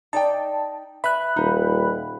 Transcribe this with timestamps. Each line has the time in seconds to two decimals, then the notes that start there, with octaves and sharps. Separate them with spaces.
0.13 D#4 D5 G5 A5
1.04 B4 E5 B5 F#6
1.36 D#1 D#4